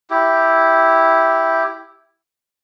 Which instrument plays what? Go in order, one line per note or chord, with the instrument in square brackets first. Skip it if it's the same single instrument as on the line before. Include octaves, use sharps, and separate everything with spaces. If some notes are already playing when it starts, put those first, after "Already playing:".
[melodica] E4 G4